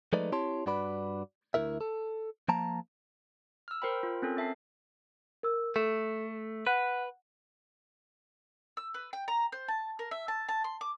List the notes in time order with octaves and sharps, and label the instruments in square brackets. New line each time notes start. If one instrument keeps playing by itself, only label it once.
[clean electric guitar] F3 G#3 A3 D#4 B4 D5
C4 E4 G4 C#5 A5 C6
G2 D4 F#4 B4 D5 B5
D2 D#3 E4 A#4 E5
A4
F3 A#3 A5 A#5
[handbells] E6 F6
A#4 C5 G5 B5
F4
C4 C#4 A4 A#4
C4 E5 A5 C7
[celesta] A#4 E6
[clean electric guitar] A3 [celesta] A4 E7
[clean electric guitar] B4 [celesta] F#5 F#6
[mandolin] E6
B4
G5
A#5
C5
A5
A#4
E5
A5
A5
C6
D6